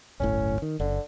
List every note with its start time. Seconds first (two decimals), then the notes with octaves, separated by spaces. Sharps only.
0.20 D1 G1 A2 C#4
0.62 D#3
0.80 F#1 D3